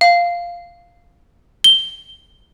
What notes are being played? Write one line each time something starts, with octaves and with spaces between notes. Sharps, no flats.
F5
G7